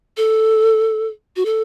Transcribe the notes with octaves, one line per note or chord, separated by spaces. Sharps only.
A4
F#4
A4